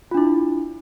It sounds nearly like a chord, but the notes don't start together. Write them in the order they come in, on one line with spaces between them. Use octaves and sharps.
F4 D4 E4